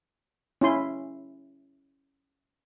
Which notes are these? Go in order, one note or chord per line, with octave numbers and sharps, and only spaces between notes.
C#4 E4 C6